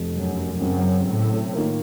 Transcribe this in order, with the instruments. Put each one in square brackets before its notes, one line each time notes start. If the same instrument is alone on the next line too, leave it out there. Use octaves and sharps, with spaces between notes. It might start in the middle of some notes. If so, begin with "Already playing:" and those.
Already playing: [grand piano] F1 F2 C3
[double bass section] F#2
[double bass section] F#2 [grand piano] C#3 F#3 C4
[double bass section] A2
[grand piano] D#3 A#3 F4 A#4